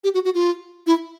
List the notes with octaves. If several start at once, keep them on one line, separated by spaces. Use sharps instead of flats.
G4
F#4
F#4
F4
E4